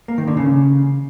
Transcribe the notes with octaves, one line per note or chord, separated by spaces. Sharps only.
A#3
D#3
D3
C#3